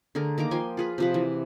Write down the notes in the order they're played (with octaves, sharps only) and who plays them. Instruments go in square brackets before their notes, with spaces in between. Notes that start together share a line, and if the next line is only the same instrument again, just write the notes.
[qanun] D3 A3 G#4 A#4
D#3 A#3 A#5 D6
F3 G5 G#5 C6
F4 G#4 B4
C3 F3 B4
E3